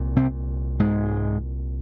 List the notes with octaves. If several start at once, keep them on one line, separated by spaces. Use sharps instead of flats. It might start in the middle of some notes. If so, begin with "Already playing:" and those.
Already playing: C2 A#2
C3 C4
G#2 G#3